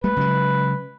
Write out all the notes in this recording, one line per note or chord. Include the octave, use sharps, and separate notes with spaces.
G3 A3 B4
C#3 F#3 G#3